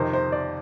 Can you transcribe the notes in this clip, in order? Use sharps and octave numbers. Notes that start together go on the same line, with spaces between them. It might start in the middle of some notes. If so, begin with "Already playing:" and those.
Already playing: F2 C3 D#3 C5
C5
D5